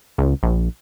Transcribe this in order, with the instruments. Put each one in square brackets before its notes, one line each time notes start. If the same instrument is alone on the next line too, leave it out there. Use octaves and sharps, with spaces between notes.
[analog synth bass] C#2
A#1